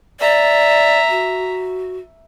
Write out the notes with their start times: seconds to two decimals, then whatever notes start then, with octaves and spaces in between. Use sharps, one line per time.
0.20 D5 E5 A#5
1.09 F#4